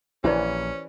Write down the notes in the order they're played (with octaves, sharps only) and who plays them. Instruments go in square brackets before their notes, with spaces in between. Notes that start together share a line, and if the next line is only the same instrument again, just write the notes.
[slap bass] A#1 [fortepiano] E3 [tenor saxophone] C#4 [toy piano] G4 C5 D5